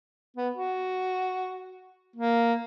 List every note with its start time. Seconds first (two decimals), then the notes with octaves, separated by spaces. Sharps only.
0.37 B3
0.56 F#4
2.16 A#3